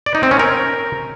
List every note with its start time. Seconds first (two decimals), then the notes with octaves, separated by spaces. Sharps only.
0.06 D5
0.15 D#4
0.23 C4
0.31 C#4
0.40 A#4